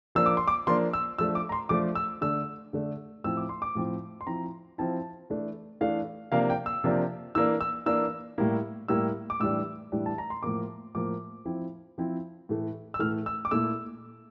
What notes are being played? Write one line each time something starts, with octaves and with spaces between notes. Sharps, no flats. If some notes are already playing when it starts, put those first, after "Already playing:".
F3 A#3 D4 E6
D6
C6
D6
F3 A#3 D4 C6
E6
F3 A3 D4 E6
D6
A#5
C6
F3 A3 D4 D6
E6
D3 A3 D4 E6
D3 A3 D4
A2 F3 C4 E4 E6
D6
C6
D6
A2 F3 C4 E4
C6
F3 C4 E4 A#5
F3 C4 E4 A5
E3 A3 D4
E3 A3 D4 F5
C3 F3 A#3 D4 F5
G5
E6
C3 F3 A#3 D4
E3 A#3 D4 E6
E6
E3 A#3 D4 E6
A2 G3 A#3 E4
A2 G3 A#3 E4 E6
D6
A2 E3 G3 D4 E6
A2 E3 G3 D4
A5
A#5
C6
A2 F3 A#3 D6
A2 F3 A#3 D6
F3 C4 E4
F3 C4 E4
A2 E3 A3
E6
A2 E3 A3 F6
E6
D6
A#2 A3 E4 E6